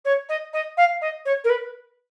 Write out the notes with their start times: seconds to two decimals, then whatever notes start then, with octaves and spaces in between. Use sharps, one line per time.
0.05 C#5
0.28 D#5
0.53 D#5
0.77 F5
1.01 D#5
1.25 C#5
1.44 A#4
1.49 B4